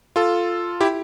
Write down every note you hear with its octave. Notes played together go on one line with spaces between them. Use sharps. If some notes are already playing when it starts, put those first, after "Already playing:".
F4 A4
E4 G4